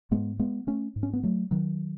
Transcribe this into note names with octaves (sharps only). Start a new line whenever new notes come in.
G#2 G#3 B3
G#3 B3
A3 C#4
G#2
C#4
B3
F#3 A3
D#3 F#3